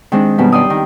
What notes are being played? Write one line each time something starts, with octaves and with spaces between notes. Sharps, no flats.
D#3 G#3 C4 D4
F#2 B2 G3
D5 G5 C6 D#6
D#3